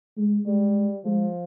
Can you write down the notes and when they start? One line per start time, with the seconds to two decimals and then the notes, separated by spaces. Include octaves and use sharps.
0.17 G#3
0.46 G3 G#3
1.04 F3 G#3